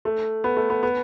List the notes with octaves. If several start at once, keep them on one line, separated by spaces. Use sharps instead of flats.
A3
B3
A3
B3
B3